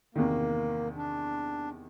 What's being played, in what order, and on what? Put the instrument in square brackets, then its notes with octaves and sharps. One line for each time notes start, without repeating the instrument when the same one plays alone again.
[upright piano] E2 C3 D#3 [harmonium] A#3
[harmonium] D4